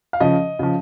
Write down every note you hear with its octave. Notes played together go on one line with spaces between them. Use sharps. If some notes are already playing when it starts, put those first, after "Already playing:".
F5
C#3 F3 D#5
C#3 F3